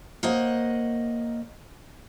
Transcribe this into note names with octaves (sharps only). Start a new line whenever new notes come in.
A#3 C5 C#5 D#5 F#5